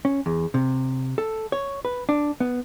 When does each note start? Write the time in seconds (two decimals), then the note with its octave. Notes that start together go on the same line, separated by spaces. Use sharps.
0.05 C#4
0.26 E2
0.54 C3
1.18 A4
1.52 C#5
1.85 B4
2.09 D4
2.40 B3